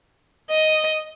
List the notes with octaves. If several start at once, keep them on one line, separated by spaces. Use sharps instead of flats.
D#5